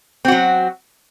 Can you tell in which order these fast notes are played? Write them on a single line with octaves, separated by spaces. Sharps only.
C4 F#4 F#3